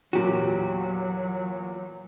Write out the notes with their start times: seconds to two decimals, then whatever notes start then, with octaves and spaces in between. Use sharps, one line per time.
0.13 E2 A#2 F#3 F#4 G4